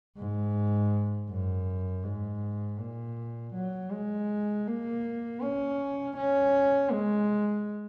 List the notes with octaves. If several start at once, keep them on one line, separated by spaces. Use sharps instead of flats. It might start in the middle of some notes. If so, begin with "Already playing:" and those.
G#2
F#2
G#2
A#2
F#3
G#3
A#3
C#4
C#4
G#3